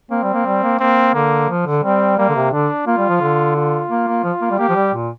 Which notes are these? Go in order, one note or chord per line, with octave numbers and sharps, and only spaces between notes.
A#3 C4
G3
A#3
G3
A#3
A#3 C4
D3 A#3
F3
D3
G3 C4
G3 A#3
D3
C3
D3 D4
A#3 F4
G3
F3
D3
F4
A#3
A#3
F3
A#3
G3
A#3 G4
F3
G3
A#2